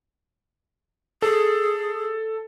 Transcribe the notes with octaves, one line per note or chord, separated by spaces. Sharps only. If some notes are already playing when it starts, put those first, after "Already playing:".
G#4 A4